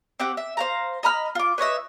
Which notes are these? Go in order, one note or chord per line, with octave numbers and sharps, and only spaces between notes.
C4 G4 F#5
E5
C5 F5 A#5
D#5 A#5 B5 F6
F4 D6
B4 C#5 D#5 E5